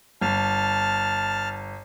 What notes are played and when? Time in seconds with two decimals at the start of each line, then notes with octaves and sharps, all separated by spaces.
0.21 G1 A5 F6